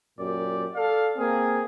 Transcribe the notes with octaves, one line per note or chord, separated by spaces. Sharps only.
F#2 A#2 G4 D5
A4 D5 F5
A#3 C4 G#4